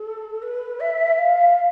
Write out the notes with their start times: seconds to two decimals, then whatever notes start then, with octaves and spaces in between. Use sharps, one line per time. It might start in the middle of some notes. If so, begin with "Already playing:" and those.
Already playing: A4
0.42 B4
0.80 E5
1.18 F5